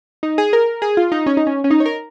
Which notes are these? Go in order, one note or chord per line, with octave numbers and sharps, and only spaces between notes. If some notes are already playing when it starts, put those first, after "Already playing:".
D#4
G#4
A#4
G#4
F4
D#4
C#4
D#4
C#4
C#4
D#4
C#5
A#4